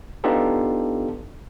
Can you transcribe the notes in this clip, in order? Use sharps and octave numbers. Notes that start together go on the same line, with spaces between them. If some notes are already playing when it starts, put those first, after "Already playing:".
B3 D4 D#4 F4 G4 A4